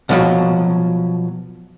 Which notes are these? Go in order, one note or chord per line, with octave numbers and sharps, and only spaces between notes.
B2 F3 F#3